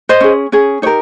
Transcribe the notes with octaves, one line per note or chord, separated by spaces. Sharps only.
C5 D#5
C#4 G#4
C#4 G#4
D#4 G4 A#4 C#5